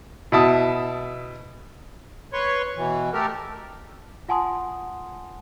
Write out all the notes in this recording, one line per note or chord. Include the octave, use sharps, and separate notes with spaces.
B2 E4 A5 D#6
B4 C#5 C6 C#6
B2 E3
A3 G4 A4 A#4
F4 F#5 G#5 A5 C6 D#6